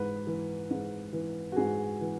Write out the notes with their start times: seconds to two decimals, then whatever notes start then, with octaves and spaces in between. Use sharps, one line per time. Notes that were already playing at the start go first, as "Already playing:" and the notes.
Already playing: G#2 E3 B4
0.27 E3
0.71 G#2
1.13 E3
1.52 F#4
1.56 G#2 G#4
2.01 E3